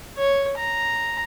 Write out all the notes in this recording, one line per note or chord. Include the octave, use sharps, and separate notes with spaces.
C#5
A#5